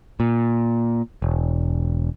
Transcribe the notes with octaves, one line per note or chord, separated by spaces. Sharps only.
A#2
E1